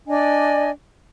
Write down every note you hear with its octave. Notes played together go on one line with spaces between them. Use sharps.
D4 D5 D#5 G#5